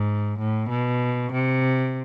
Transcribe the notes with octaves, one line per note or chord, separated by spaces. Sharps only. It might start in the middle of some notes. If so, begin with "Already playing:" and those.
Already playing: G#2
A2
B2
C3